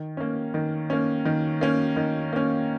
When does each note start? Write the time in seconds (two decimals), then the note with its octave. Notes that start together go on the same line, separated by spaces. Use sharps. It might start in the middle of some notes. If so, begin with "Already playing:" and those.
Already playing: D#3
0.17 A#3 C#4
0.54 D#3
0.90 A#3 C#4
1.25 D#3
1.61 A#3 C#4
1.97 D#3
2.33 A#3 C#4